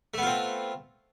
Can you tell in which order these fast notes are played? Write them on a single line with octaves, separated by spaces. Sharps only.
A3 B3 F4 C4